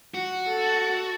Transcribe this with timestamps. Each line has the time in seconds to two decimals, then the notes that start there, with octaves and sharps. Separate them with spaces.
0.14 F#4
0.48 A4